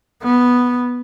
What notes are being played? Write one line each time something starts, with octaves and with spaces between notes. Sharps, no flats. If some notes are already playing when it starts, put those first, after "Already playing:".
B3